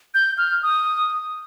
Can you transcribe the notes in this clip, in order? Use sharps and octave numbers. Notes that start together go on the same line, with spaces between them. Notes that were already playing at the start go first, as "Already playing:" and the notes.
G6
F6
D#6